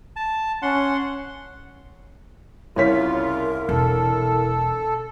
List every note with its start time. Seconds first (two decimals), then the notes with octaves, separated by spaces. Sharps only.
0.16 A5
0.62 C#4 F#5 C6
2.76 C2 C#3 F4 A#4 C#5 B6
3.69 E1 A4